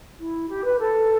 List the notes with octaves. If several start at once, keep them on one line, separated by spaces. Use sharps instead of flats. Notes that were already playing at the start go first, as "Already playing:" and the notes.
E4
G4
B4
A4